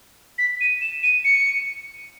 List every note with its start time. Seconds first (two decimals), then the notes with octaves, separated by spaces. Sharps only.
0.38 B6
0.61 D#7
0.81 E7
1.03 D#7
1.24 C#7